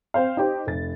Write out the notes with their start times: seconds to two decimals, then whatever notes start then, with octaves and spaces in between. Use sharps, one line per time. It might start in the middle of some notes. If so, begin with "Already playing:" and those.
0.14 C4 C5 F5
0.37 D#4 G4 C5
0.66 F1 A6